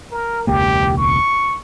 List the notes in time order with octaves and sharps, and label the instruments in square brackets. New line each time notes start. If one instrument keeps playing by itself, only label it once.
[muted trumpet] A#4
[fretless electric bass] E1 C#2 A#3 [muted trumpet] G4
[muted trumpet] C#6